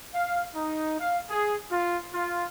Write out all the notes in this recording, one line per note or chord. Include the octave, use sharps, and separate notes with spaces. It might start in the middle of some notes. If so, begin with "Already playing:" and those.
F5
D#4
F5
G#4
F4
F4